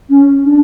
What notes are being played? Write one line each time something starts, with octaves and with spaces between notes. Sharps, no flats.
C#4
D4